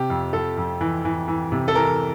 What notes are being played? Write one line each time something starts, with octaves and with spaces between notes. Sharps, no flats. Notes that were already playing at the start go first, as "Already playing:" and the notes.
Already playing: C3 G4
F2
F2 A4
F2
E3
E3
E3
C3
A4
E3 A#4